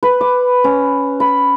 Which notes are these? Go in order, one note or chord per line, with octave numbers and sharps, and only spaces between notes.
B4
D6
C#4
B5